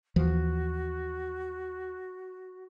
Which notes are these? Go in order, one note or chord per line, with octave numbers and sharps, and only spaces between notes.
D#2 E3 F3 F#4